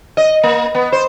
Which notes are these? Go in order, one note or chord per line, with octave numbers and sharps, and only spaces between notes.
D#5
A#3
B3
C5